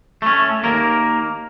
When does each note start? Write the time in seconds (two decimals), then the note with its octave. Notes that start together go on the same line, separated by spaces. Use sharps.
0.22 A3 C#4
0.63 D#2 A#3 A#4